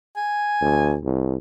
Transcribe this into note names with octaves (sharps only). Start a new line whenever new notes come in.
G#5
D2
C2